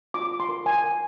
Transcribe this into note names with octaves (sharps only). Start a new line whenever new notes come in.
F4 D6
F4
C6
A#4
A#4 G#5
A#4